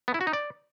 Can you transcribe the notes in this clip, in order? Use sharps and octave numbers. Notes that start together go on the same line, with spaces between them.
B3
E4
F#4
D#4
D5